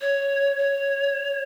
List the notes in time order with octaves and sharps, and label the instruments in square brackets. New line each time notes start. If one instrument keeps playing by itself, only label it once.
[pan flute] C#5
C#5